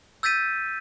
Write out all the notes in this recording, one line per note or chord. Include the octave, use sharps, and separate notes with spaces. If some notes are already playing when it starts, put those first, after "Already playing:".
E6 G6 A6 B6 D#7